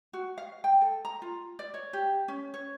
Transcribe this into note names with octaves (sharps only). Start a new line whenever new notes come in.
F#4
F5
G5
A4
A#5
F4
D5
C#5
G4
C#4
C#5